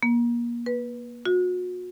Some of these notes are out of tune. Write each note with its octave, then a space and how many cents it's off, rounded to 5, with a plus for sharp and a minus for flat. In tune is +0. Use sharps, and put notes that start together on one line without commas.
A#3 +30
B4 -20
F#4 -35